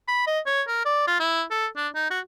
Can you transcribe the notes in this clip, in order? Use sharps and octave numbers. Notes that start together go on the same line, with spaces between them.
B5
D#5
C#5
A#4
D5
F4
E4
A4
D4
D#4
F#4